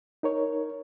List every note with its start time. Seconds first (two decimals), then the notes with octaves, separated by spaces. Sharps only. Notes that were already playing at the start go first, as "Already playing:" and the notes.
0.23 D#4 A#4 C#5